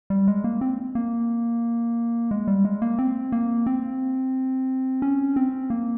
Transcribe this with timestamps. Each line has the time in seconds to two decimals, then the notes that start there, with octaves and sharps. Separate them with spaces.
0.10 G3
0.28 G#3
0.44 A#3
0.61 C4
0.95 A#3
2.31 G#3
2.48 G3
2.65 G#3
2.82 A#3
2.99 C4
3.32 A#3
3.67 C4
5.02 C#4
5.36 C4
5.70 A#3